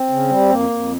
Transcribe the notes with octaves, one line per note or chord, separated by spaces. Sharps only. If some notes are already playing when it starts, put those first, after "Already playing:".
Already playing: C4
C#3
G3
F2 A#3
F2